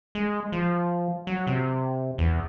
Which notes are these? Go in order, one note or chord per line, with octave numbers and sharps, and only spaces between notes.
G#3
F3
F#3
C3
E2